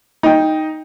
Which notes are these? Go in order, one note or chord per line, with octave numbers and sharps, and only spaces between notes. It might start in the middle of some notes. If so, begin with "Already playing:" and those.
D#4 G5